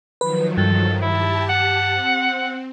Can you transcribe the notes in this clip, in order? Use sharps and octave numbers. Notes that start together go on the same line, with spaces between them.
D#3 F3 F#3 B4
G2 A4
E4 G4 A5
F#5
C4